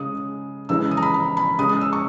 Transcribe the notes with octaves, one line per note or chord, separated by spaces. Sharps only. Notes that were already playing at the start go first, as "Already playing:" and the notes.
Already playing: C#3 G#3 D#6
C#3 E3 G#3 E6
D#6
A#5
B5
A#5
B5
C#3 G#3 D#6
D#6
E6
C#6